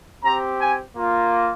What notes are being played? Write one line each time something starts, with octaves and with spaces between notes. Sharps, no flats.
C4 G4 A#5
G#5
A#3 F4